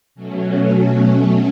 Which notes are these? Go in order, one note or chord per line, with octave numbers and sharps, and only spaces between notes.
B2 F#3 A3 C#4
C#4